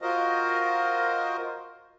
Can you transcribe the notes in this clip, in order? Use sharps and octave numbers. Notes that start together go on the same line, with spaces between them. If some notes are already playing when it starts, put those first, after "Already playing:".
F4 F#4 A#4 C5 D#5